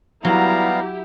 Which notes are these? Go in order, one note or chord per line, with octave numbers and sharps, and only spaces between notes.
F#3 G3 B3 E4 G4 F5 A#5